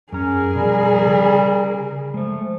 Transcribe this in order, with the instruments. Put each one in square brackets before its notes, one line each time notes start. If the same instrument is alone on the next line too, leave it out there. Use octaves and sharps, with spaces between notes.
[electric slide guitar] F#2 A#5 [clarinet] C#4 [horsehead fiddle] G#4 A#4
[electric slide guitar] B2 F3 [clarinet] G3
[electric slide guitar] C#3
[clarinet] F3 [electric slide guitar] G#3 A3